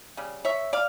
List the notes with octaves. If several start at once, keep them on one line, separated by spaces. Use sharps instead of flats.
C#3 G3
C#5 E5
D5 F5